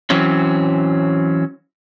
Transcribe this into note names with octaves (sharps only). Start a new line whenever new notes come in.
E3 F#3 C4 C#4